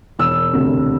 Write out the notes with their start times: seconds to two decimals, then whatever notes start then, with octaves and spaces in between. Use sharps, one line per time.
0.19 E1 E6
0.53 D2 C3